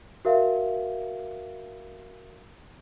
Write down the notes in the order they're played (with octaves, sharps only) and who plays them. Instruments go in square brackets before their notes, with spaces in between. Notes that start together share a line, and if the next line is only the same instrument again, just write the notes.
[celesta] F#4 A#4 E5 F5